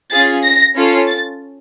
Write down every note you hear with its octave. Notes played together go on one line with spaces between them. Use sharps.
C#4 F4 G#4 A6
A#6
C#4 F4 A4
A6